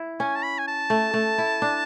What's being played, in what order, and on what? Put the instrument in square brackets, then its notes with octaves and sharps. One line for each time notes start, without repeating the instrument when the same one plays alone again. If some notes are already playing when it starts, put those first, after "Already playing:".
Already playing: [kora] E4
[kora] C#4 [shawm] G#5
[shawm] A5
B5
G#5
A5
[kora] A3
A3
E4
D4